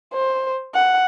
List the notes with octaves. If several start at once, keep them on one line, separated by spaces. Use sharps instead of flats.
C5
F#5